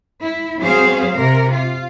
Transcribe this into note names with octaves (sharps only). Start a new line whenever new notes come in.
E4
F#3 G3 C4 G#4 C5 F5
C3 A#4
F4